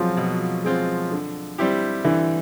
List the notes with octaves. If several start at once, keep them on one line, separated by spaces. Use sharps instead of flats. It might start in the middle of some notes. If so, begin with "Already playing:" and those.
Already playing: B2 F3 F#3 G#3 C4 F4
B2
G#3 C4 F4
D3
G3 C4 E4 G4
D3 E3